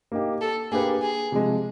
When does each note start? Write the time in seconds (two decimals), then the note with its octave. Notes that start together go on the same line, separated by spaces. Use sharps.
0.12 A#3 D#4 G4
0.41 A4
0.72 A#3 D4 G4 G#4 B4
1.02 G#4
1.32 C3 F3 G#3